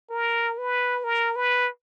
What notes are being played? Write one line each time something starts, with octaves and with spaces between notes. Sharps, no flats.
A#4
B4
A#4
B4